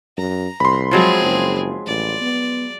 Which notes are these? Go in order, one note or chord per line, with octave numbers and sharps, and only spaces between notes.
F#2 A#5
C2 B5 C6
F3 F#3 G#3 C4 G#4
F#1
A1 D5
B3